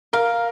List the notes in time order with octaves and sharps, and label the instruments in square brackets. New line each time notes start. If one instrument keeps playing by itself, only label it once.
[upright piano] A#4 [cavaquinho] F5